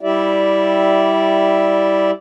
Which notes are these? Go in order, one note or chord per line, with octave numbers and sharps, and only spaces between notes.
G3 E4 G4 D5 E5